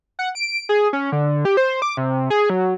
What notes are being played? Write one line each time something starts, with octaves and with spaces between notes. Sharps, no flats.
F#5
D7
G#4
C#4
D3
G4
C5
D6
C3
G#4
F#3